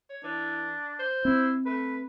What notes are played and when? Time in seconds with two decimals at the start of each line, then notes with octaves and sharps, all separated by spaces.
0.10 C#5
0.24 E3 D4
1.00 C5
1.25 C4 E4
1.66 A3 B4